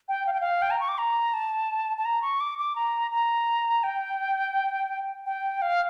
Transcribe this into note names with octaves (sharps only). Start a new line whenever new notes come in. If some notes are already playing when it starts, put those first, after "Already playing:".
G5
F5
G5
F5
G5
A#5
C#6
D6
A#5
A5
A5
A#5
C#6
D6
D6
A#5
A#5
G5
G5
F5